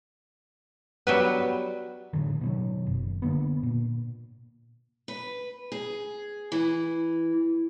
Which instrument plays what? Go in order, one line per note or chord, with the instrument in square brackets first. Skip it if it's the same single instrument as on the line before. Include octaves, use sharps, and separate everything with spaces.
[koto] F#3 G3 B4 [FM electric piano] B3 F#4
[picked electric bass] A2 D3 D#3
B2 D#3 F#3
F#1
D3 A#3 B3
A#2
[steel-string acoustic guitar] B4
G#4
E3